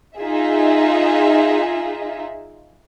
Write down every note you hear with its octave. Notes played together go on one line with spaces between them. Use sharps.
D#4 F4 G#4 E5